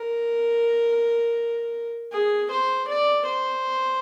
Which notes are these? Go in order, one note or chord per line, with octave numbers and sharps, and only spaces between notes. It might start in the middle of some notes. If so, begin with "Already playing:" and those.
Already playing: A#4
G#4
C5
D5
C5